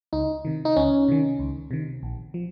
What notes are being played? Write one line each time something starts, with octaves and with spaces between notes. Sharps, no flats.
C#2 D#4
C3 D#3
D#4
C#2 C#4
C3 D#3
C#2
C3 D#3
A#1
F3